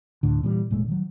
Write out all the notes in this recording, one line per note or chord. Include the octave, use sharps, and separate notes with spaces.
D2 A2 D3
A#2 E3 G3
E1 A#2 G#3 A3
D#3 F#3